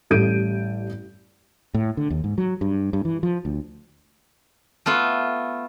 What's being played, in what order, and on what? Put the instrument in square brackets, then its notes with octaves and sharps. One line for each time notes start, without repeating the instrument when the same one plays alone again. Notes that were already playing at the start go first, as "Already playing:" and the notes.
[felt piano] A1 G3 A4 G6 D7 D#7
[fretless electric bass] A2
D3
D#2
G#2
F#3
G2
G2
E3
F3
D2
[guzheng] A3 B3 F4